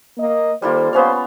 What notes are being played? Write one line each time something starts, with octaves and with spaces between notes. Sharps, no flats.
A#3 D#5
D#3 G3 A#3 F4 A4 C5
B3 C#4 C5 F5